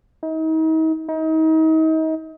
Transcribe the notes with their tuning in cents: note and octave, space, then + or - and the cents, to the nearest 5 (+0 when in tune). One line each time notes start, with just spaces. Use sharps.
D#4 +40
D#4 +35